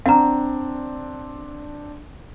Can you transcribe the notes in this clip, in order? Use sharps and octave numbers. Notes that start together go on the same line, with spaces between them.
C4 D4 F#5 A#5